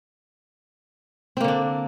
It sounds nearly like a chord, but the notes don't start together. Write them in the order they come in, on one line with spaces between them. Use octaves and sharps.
C4 A#3 D3 D4